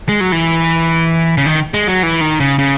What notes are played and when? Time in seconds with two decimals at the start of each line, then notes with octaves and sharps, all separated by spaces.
0.09 G#3
0.21 F#3
0.32 E3
1.38 C#3
1.46 D#3
1.74 G#3
1.88 F#3
2.03 E3
2.21 D#3
2.40 C#3
2.59 C#3